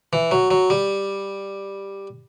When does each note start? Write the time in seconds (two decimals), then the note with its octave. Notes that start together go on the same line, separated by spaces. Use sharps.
0.13 E3
0.31 F#3
0.51 F#3
0.70 G3